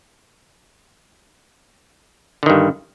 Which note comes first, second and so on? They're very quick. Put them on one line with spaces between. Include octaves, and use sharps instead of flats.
D3 D#3 G2